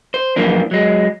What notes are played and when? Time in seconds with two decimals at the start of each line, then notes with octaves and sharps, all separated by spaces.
0.14 C5
0.36 F#2 E3 F3 A#3 D4
0.71 F#3 G#3